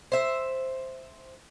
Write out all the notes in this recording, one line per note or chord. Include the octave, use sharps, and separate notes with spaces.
C5 E5